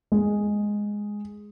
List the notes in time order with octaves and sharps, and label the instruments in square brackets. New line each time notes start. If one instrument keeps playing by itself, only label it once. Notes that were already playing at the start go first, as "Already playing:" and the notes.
[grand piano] G#3